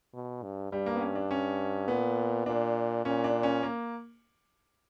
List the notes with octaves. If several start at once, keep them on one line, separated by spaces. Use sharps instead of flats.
B2
G2
G2 G3
A#3
B3
C#4
D4
C#4
A#2 B3
A#2 D4
A#2 C#4
D4
C#4
A#3